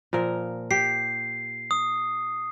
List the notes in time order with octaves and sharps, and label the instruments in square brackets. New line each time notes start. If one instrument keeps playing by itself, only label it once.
[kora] A#2 F3 A#4
[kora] G4 [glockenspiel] C7
[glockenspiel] D#6